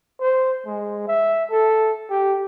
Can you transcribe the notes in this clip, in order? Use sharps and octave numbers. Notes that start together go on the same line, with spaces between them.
C5
G#3
E5
A4
G4